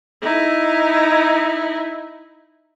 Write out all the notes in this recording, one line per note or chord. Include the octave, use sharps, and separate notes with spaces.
D#4 E4